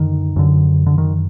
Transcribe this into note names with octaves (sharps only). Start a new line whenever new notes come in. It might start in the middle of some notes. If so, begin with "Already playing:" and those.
Already playing: F#2 D3 D#3
F#2 D3
D3
D#3